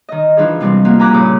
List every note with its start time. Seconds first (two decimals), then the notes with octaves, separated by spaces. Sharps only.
0.09 D#3 D#5
0.37 E3 F3 D4 D#4 G#4
0.60 C3 F3 G3 G#3 C4
0.85 F3 A#3 F#4
0.99 G5 G#5 A#5 B5 D6 F#6
1.13 G2 A#2 C#3 D6 D#6